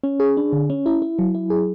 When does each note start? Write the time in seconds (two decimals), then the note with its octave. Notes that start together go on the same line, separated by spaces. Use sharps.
0.04 C#4
0.20 G#4
0.37 D4
0.53 D3
0.70 C#4
0.86 E4
1.02 E4
1.19 F#3
1.35 E4
1.50 G#4